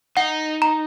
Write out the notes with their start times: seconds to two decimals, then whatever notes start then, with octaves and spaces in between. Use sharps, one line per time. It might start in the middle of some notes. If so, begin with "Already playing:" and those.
0.17 D#4 F#5
0.62 A#5